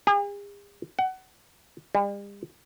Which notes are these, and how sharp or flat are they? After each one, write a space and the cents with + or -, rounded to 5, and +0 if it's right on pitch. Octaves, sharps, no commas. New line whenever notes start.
G#4 -45
F#5 +25
G3 +45